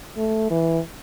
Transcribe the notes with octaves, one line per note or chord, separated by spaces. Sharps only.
A3
E3